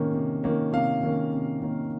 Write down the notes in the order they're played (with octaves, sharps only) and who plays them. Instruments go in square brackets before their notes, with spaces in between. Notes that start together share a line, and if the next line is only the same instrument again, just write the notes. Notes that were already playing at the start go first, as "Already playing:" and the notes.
Already playing: [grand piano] C3 D#3 A#3 C#4
C3
D#3 A#3 C#4
C3 F5
D#3 A#3 C#4
C3
D#3 A#3 C#4